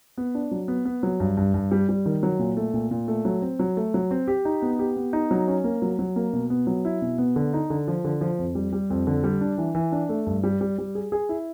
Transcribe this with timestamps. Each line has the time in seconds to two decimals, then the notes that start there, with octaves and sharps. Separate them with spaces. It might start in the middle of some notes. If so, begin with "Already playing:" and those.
0.18 B3
0.35 D4
0.51 F#3
0.68 B3
0.85 B3
1.03 F#3
1.20 G2
1.37 G2
1.54 G2
1.71 G3
1.89 G3
2.06 D#3
2.23 F#3
2.39 A#2
2.57 A3
2.74 A#2
2.91 A#2
3.08 A3
3.25 F#3
3.42 C4
3.59 F#3
3.77 A3
3.94 F#3
4.11 C4
4.28 G4
4.45 D#4
4.62 B3
4.79 G4
4.96 B3
5.13 D#4
5.31 F#3
5.48 C#4
5.64 A#3
5.82 F#3
5.99 F#3
6.16 A#3
6.33 B2
6.50 B3
6.67 F#3
6.85 E4
7.02 B2
7.18 B3
7.36 D3
7.53 D#4
7.70 D3
7.88 F3
8.04 D3
8.21 F3
8.39 F2
8.55 G3
8.73 G3
8.90 F2
9.07 D3
9.24 G3
9.41 D4
9.58 E3
9.75 E3
9.92 D4
10.09 A3
10.27 G2
10.44 G3
10.61 G3
10.78 G3
10.95 G#4
11.12 G#4
11.29 E4